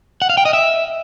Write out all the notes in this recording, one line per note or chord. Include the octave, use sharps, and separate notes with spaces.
F#5
F5
G5
D#5
E5